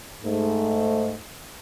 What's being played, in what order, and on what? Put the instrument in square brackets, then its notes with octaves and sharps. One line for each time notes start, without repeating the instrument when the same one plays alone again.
[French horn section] G#2 A3